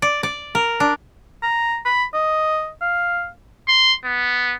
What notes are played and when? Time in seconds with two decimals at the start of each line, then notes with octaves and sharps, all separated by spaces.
0.02 D5
0.23 D5
0.55 A#4
0.80 D4
1.43 A#5
1.85 B5
2.14 D#5
2.81 F5
3.68 C6
4.05 B3